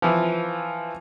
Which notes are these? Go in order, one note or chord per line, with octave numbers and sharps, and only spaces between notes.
E3 F3